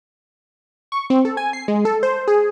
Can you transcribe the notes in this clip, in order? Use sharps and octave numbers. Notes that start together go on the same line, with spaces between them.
C#6
C4
A4
G#5
C7
G#3
A4
C5
G#4